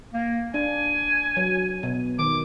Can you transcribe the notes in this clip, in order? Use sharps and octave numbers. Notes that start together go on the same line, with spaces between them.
A#3
D4 G#5
F#3
B2
D#3 D6